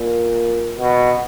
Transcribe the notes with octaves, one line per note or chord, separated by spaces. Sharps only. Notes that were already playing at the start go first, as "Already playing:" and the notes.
Already playing: A#2
B2